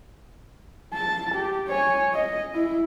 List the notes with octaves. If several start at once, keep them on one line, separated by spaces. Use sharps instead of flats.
A5
G4
C#5 G#5
D#5
E4